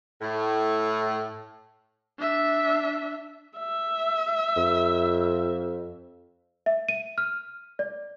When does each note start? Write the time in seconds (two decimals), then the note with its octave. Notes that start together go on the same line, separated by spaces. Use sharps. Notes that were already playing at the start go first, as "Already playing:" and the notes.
0.21 A2
2.18 D4 E5
3.59 E5
4.57 F2
6.66 E5
6.89 D#7
7.18 F6
7.79 D5